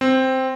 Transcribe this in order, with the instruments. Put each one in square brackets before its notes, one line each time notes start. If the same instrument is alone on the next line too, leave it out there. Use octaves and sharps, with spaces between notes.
[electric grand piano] C4